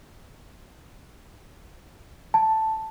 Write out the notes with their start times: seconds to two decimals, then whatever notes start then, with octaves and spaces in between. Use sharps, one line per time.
2.34 A5